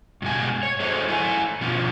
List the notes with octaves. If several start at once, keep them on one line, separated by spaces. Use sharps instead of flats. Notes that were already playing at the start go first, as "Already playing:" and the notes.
G2 B2 G#3 G#5
C#5
F#3 G#4 A4 C5 C#5 D#5
A3 E4 C#5 G#5
B2 F3 C#4 F4